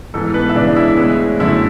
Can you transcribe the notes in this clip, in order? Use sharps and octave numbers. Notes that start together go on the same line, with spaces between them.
G#2 E3 B3 A4
B3 B4
E5
C#3 E3 G#3 B3 D4 D5
E4 E5
A2 G#3 B3
F#2 D3 A3 E4 E5